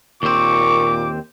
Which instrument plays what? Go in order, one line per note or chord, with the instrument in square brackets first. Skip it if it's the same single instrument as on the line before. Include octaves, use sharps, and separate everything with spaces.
[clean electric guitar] D#2 C4 [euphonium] A#2 [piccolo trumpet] C#6 [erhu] D6